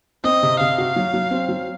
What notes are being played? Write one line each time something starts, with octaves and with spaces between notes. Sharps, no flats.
C4 D#5
C3
C3 F5
F#4
F#3
F#3
C4
F#3